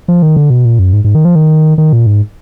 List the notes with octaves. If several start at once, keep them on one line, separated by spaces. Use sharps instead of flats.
F3
D#3
D3
B2
A#2
F#2
G#2
G#2
D#3
F3
D#3
D#3
A#2
G#2